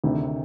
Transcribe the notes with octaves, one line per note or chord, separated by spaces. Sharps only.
D2 C3 D#3